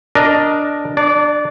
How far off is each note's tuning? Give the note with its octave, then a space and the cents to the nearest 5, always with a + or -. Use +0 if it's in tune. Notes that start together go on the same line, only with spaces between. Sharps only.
D4 +0 A#4 +10 D#5 +0
D4 +20 D5 -25